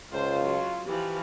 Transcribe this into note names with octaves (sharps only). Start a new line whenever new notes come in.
C#2 F4 C5
F#3
E3 F3 G4